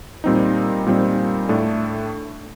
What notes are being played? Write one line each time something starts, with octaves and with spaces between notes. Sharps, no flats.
A#2 G3 C4 D#4
A#2 G3 C4 D#4
A2 A3 D4 A4